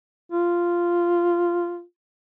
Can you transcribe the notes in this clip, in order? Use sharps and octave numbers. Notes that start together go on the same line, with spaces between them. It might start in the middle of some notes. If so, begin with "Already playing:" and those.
F4